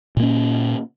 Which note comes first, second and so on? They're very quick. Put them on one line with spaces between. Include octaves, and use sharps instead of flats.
A#2 A#3 C#4